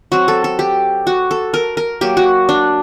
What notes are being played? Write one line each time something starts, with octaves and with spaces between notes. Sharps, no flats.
F#3 C4 F#4
A4
A4
G4
F#4
A4
A#4
A#4
F#3 A#3 G4
F#4
D4